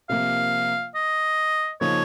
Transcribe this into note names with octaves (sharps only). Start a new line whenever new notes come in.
C3 F3 A#3 F4 F5
D#5
C#3 F3 A#3 D#4 C#5